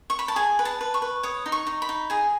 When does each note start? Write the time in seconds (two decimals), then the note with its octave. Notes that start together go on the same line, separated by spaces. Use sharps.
0.10 C#6
0.19 B5
0.28 A5
0.36 G#4 G#5
0.59 B4
0.65 A5
0.81 B4
0.94 C#6
1.02 B4
1.23 C#5 D#6
1.46 D#4
1.52 C#6
1.67 D#4
1.82 B5
1.89 D#4
2.10 G#4 G#5